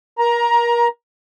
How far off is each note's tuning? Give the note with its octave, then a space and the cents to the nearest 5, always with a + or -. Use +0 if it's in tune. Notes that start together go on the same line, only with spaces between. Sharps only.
A#4 +30 A#5 +15